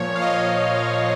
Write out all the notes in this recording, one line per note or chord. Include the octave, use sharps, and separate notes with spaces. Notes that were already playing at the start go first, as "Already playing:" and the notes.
Already playing: A#2 F3 C#5
F5
D#5